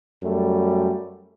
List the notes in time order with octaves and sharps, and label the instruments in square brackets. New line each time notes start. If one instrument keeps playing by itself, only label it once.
[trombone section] F#2 G3 A3